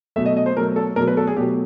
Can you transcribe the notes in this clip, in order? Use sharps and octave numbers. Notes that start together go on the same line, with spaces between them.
B2 F#3 A3 E5
D#5
D#5
C5
B2 F#3 A3 A#4
A4
B2 F#3 A3 A#4
B4
A4
G#4
B2 F#3 A3 G4